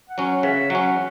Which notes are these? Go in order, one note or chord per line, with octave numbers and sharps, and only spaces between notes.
F#5
F#3 C#4
F#5
C#3 E5
F#3 C#4 F#5